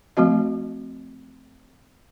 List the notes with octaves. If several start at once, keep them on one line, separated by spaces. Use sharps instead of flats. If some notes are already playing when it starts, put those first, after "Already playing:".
F3 A3 C4 F#4 D#5